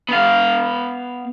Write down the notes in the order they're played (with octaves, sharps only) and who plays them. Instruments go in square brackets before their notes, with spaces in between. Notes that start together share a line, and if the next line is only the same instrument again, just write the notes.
[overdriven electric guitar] B3 F5